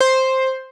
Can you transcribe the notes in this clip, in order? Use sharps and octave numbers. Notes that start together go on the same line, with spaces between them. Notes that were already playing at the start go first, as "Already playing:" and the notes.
C5